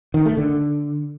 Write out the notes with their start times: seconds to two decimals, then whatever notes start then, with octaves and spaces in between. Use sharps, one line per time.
0.14 D#3
0.26 A3
0.37 D3